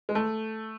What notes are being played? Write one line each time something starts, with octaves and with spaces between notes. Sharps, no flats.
G#3
A3